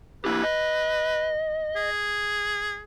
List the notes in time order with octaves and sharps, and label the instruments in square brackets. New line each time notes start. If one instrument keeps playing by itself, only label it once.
[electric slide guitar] A#3 E4 G4 [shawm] B4
[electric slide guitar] D#5
[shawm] G#4